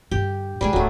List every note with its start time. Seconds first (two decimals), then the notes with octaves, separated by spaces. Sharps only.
0.11 G2 D3 G4
0.61 G#2 G3 G#3 D4 G#4
0.73 D1 E2 F#3 A3